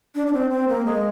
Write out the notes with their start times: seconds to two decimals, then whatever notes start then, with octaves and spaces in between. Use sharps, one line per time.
0.15 D4
0.27 D4
0.33 C4
0.50 C4
0.68 A#3
0.85 G#3